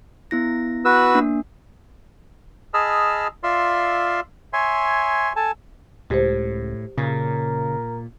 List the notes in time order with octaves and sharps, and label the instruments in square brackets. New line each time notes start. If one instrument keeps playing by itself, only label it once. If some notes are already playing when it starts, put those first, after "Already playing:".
[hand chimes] B3 E4 A#6
[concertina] F#4 B4 E6
[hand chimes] A#3 D4
[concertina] G#4 D#5 A5 B5 E6 F6
F4 D5 E5 F5 C6 E6
C#5 E5 G#5 C6
A4 G#5 A5
[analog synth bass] C#2 [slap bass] A2 [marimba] G4 C5
[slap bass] A#2 [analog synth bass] C#3 [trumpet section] A#4